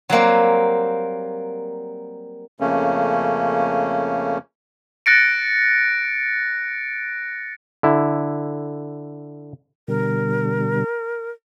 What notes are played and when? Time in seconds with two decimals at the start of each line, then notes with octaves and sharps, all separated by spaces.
0.09 F#3 G3 A#3 C4
2.60 F2 C#3 A3 A#3 C#4
5.06 F#6 A6 A#6 C#7 D7
7.83 D3 E4
9.88 B2 D3 G3 A#4